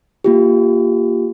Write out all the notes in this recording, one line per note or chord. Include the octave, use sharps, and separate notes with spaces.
A#3 F4 G4